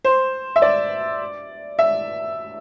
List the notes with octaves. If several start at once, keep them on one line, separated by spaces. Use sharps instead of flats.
C5
E5
D5
E5